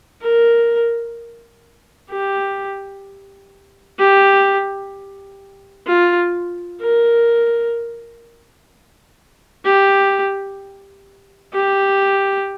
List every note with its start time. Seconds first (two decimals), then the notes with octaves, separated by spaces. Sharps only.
0.21 A#4
2.10 G4
3.99 G4
5.87 F4
6.81 A#4
9.65 G4
11.53 G4